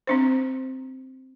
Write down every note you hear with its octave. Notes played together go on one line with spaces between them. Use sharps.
C4 D4 C5